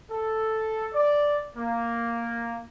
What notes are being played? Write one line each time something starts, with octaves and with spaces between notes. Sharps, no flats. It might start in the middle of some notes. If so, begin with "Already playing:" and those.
A4
D5
A#3